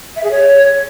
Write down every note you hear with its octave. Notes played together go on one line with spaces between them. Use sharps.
E5
G#4
C#5